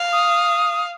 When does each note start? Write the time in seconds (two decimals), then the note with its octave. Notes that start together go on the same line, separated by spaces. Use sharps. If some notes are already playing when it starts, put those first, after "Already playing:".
Already playing: F5
0.12 D#6